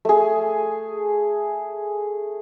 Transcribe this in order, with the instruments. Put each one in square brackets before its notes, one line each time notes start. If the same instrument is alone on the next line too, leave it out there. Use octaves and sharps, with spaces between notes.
[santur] A3 G#4